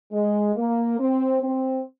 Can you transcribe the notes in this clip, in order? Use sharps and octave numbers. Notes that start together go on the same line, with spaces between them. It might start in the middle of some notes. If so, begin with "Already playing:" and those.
G#3
A#3
C4
C4